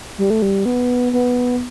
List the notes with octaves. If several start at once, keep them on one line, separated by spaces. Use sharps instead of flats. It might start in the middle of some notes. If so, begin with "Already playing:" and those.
G3
A3
G3
B3
B3